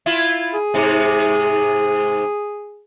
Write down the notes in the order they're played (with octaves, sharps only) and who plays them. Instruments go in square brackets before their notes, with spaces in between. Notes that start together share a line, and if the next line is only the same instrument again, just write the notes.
[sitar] E4 F4
[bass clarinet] G#4
[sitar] G#2 C3